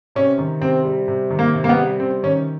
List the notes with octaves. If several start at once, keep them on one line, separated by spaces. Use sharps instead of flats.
C3 C#4
D#3
C3 C4
G3
C3
D#3
A#3
C3
A#3
B3
G3
C3 C4
D#3 C#4